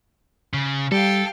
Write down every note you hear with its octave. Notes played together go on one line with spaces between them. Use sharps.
C#3
G3 G4 A4 F5